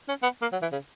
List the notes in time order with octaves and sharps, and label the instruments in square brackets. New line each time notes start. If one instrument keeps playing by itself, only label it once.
[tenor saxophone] C#4
B3
A#3
F#3
E3
C#3